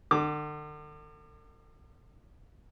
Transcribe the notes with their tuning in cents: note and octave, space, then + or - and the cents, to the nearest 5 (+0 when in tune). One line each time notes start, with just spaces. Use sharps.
D3 +40 D6 +0